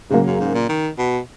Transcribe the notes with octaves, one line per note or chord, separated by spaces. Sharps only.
G#2 C#3 F#3 A#3
F#2
G#2
A#2
D#3
B2